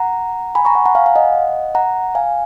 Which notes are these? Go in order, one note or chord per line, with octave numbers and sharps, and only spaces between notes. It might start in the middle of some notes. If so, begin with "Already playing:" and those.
Already playing: F#5 A#5
G#5 B5
A#5 C#6
F#5 A#5
F#5 A#5
F5 G#5
F5
D#5 F#5
F#5 A#5
F5 G#5